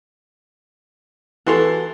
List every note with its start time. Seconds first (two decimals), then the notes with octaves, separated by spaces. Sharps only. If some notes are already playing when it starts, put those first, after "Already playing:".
1.46 E3 F#4 A4 C6